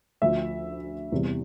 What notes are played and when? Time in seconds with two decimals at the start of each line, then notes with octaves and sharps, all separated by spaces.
0.22 D2 D3 F3 E5
1.12 E2 C3 G3